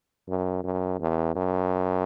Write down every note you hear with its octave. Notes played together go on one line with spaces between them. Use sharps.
F#2
F#2
E2
F#2